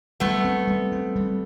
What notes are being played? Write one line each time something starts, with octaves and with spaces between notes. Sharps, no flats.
G3 A3 B3
C4
G3
C4
G3